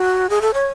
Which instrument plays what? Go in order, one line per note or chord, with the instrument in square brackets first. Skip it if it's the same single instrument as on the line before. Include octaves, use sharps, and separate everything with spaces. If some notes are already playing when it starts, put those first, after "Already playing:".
Already playing: [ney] F#4
G#4
A4
C#5